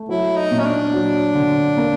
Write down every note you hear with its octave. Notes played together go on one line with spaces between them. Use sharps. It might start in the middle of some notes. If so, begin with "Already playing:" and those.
Already playing: A3
F#3 E4
D#4
A#2
C#4
D4
F#3
D3
A#3